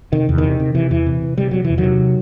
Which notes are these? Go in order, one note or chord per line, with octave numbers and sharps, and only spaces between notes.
C3 D#3
E2
D#3
C3
C3
C3 E3
E2 E3
C3
C3
C3 G3
C3 F#3
E2 E3
D#3 F#3
C3